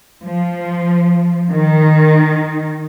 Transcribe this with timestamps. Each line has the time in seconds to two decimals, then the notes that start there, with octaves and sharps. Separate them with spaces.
0.23 F3
1.50 D#3